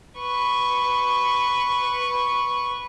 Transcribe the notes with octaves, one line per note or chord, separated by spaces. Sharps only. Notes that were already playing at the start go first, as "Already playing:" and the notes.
B4 C#6